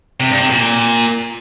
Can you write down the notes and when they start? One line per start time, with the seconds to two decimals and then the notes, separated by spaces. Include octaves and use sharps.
0.20 C3
0.30 G2
0.40 C3
0.50 A#2